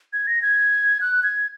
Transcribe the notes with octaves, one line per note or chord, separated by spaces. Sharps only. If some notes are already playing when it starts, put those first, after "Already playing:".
G#6
A#6
G#6
F#6
G#6